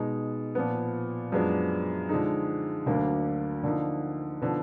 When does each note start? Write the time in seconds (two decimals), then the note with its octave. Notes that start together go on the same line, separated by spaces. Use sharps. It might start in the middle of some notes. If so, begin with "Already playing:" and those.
Already playing: B2 G#3 D#4
0.55 A#2 F3 B3
1.32 F#2 F3 G#3 B3 D4
2.09 D3 F3 G#3 D#4
2.86 D2 D3 F#3 A#3 D4
3.63 D3 F3 A#3 D#4
4.42 D3 F3 B3 D#4